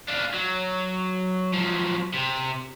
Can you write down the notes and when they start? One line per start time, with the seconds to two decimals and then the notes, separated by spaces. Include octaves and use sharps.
0.08 D4 F4
0.34 F#3
1.53 F3 F#3
2.14 C3